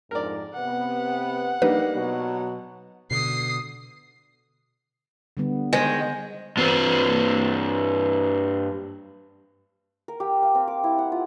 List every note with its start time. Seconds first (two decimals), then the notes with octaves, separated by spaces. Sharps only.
0.11 F2 G#2 A#4 D5
0.54 C3 B3 F#5
1.62 G3 A#3 D#4 B4
1.94 B2 F#3 B3
3.11 B2 D3 D#6 C7
5.37 D3 G3 B3
5.73 D#3 G#3 C5
6.57 G2 C4
10.08 A#4
10.20 G4
10.43 F5
10.55 C4
10.67 D6
10.84 E4
10.98 F#5
11.12 F4